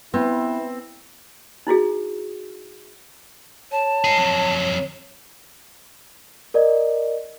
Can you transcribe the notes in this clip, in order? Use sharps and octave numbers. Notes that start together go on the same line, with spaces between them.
B3 C4 E4
D#4 E4 F#4 G#4
C#5 A5
D#4 G#4
F2 F#3
A#4 D5 D#5